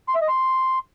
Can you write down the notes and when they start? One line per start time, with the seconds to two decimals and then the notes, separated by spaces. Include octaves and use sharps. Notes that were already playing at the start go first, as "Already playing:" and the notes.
0.08 C6
0.15 E5
0.22 D#5
0.28 C6